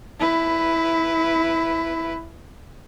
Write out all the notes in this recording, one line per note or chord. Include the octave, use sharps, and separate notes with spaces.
E4 B4